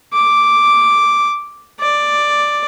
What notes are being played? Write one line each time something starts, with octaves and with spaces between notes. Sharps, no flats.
D6
D5